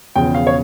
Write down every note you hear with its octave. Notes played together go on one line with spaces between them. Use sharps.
E1 E2 C#3 F3 G5
F5
C#5